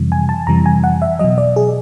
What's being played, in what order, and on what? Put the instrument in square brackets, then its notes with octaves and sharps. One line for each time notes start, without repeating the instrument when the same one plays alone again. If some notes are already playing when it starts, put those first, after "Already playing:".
Already playing: [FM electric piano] F2 C3 E3 G3
G#5
A5
F2 C3 E3 G3 A#5
G#5
F#5
E5
B2 F#3 D#5
D5
G#4